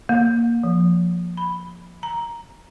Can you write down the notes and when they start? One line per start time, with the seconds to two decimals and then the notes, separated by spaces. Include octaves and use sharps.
0.09 A#3
0.63 F3
1.37 B5
2.03 A#5